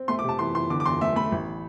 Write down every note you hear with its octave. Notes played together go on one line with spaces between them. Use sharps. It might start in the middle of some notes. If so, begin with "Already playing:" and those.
Already playing: C4
A3 C6
D6
C3 A5
E3 C6
E3 C6
D3 D6
D6
E2 C6
A3 E5
A3 B5
A1